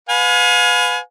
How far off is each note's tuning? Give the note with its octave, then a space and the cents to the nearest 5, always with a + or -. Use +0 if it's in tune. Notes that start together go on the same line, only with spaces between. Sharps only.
B4 +15 F5 +40 G#5 +20